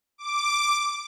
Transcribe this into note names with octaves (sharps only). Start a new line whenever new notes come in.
D6